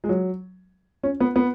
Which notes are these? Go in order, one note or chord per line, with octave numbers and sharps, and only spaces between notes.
G#3
F#3
C#4
B3
B3